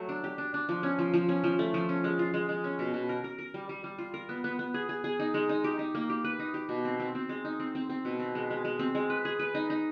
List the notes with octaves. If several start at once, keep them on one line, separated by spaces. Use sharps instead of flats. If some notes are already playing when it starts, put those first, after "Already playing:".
Already playing: F#3 A3
D4
G4
D4
D4
F3
C#4
F3
F3
C#4
F3
A3
F3
C#4
G#3
F4
G#3
G#3
C#4
B2
B2
A#4
A#4
A#4
G3
G3
G3
F4
A#4
B3
B3
B3
G#4
G#4
G#4
D#4
G#3
D#4
G4
D#4
A#3
G4
B4
D#4
G4
B2
C4
C4
C4
G#3
D#4
C4
C4
C4
B2
C4
G#3
G#3
G#3
C4
G#3
B4
G#4
B4
D#4
D#4